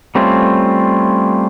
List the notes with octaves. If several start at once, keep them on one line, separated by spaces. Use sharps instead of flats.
G3 A3 C4 C#4 F4